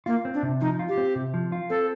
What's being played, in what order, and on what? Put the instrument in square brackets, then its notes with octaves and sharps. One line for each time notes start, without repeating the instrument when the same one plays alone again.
[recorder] A#3 [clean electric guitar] F4
[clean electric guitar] C4
[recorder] D4
[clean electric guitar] C3
[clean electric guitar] F3 [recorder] D#4
[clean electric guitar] F4
[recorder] G4
[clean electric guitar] C4
C3
F3
F4
[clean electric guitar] C4 [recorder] A4